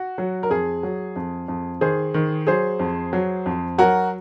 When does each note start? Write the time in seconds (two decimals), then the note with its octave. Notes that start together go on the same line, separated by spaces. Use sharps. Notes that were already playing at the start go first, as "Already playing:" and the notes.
Already playing: F#4
0.18 F#3
0.43 A#4
0.50 F2 G#4
0.83 F#3
1.16 F2
1.48 F2
1.81 D#3 G#4 C5
2.14 D#3
2.47 F#3 G#4 C5
2.80 F2
3.13 F#3
3.46 F2
3.78 F#3 F#4 A#4